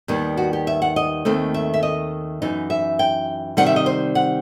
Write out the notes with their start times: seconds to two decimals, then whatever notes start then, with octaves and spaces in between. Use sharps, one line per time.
0.08 D#2 D#3 G3 B3
0.37 F#4
0.53 G4
0.67 E5
0.82 F#5
0.96 D#5
1.25 D#2 D#3 A3 C4 D#4
1.54 E5
1.74 E5
1.83 D#5
2.42 F#2 E3 B3 D#4
2.70 E5
2.99 G5
3.57 C3 D#3 G3 C4 D#4 F#5
3.66 E5
3.76 D#5
3.86 C5
4.15 F#5